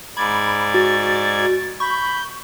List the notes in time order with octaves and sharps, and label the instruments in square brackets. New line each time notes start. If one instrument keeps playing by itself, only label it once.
[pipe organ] G#2 D5 G#6 [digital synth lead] B5
[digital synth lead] F#4 [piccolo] A6
[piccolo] B5 [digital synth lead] C#6 [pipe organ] G6